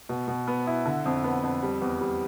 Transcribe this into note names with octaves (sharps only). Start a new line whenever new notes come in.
B2
B2
B3
E4
D3
F2
B3
F2
G3
E2
G3